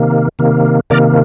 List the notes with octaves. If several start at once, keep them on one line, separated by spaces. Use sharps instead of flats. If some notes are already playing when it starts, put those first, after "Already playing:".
Already playing: C3 D#3 A#3
C3 D#3 A#3
C3 D#3 A#3 A#4 D5